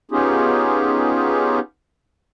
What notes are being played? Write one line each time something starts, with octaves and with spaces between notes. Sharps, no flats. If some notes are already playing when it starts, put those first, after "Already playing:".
B3 C#4 D#4 F4 G4 G#4